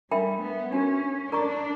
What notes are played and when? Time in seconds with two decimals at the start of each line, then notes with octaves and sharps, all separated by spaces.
0.11 G3 D4 A#4 E5 G5 B5
0.42 B3
0.73 C#4 D4 F#4 A#4
1.32 D4 A#4 D5 A#5 C#6